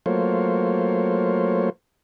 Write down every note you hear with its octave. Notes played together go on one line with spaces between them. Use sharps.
F#3 A3 A#3 F4 C5 C#5